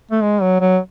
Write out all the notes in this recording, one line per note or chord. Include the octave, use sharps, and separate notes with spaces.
A3
G#3
F#3
F#3